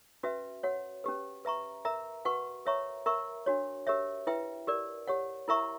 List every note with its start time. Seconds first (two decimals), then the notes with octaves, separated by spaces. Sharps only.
0.23 C#4 F#4 B4 E5
0.63 F#4 C#5 F#5
1.04 C#4 G4 B4
1.45 B4 E5 A#5 C#6
1.85 A#4 E5 A#5
2.25 F#4 B4 F#5 C#6
2.65 A#4 C#5 E5 A#5 C#6
3.06 A#4 E5 A#5 C#6
3.46 D4 F#4 C#5
3.87 G4 A#4 C#5 E5
4.27 E4 B4 E5 G5
4.67 G4 A#4 D5
5.08 G4 C#5 F#5
5.48 E4 A#4 E5 A#5 C#6